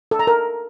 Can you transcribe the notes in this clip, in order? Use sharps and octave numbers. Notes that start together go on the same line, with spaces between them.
A4
A#5
A#4